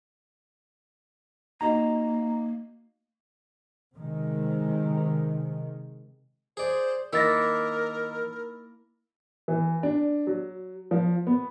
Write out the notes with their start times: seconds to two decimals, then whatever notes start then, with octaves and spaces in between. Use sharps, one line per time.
1.61 A#3 D#4 F#4 D#5 A#5
3.95 C3 D#3 G#3
6.57 G#4 C5 D5
7.13 D#3 A#3 D#4 E4 A#4 E6 A6 A#6
9.48 E3
9.83 D4
10.27 F#3
10.91 F3
11.27 B3